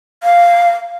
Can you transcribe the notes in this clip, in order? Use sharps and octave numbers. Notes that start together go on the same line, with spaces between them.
F5